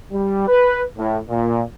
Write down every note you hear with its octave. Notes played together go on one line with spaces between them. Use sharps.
G3
B4
A2
A#2